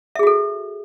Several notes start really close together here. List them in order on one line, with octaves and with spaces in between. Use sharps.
E5 G#4 F#4 A4